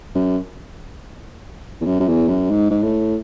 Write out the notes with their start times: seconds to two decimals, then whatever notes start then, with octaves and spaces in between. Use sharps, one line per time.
0.15 F#2
1.81 E2
1.86 F#2
2.00 F#2
2.07 E2
2.28 F#2
2.50 G#2
2.71 G#2
2.83 A2